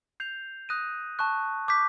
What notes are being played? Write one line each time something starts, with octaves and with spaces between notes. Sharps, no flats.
G6 C7 F7
D#6 F#6 A#6 D#7
A5 C#6 F#6
D6 G6 B6